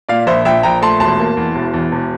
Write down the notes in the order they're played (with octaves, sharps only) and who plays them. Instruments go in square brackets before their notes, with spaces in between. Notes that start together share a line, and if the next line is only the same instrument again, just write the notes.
[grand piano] A#2 D5 F5
A#1 C5 E5
A#1 E5 G5
A#1 G5 A#5
A3 A5 C6
E1 A5 C6
A#3
E2
E1
E2
E1